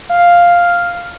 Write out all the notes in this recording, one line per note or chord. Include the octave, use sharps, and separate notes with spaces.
F5